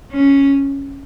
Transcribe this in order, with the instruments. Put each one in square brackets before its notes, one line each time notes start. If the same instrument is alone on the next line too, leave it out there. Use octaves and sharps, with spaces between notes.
[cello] C#4